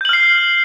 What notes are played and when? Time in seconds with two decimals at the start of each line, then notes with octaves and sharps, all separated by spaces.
0.01 G6
0.05 F#7
0.09 F6
0.13 C7